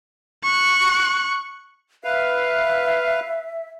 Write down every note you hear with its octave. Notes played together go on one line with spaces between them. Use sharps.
C#6 F#6
B4 E5 F5